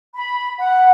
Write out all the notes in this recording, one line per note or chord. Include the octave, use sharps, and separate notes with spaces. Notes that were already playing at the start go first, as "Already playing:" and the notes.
B5
F#5